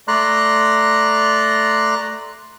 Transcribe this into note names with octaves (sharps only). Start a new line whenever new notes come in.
A3 D5 A#5 C6 F#6